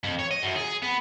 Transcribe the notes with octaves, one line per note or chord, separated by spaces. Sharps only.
F2
C#5
D#5
F#2
G#4
B3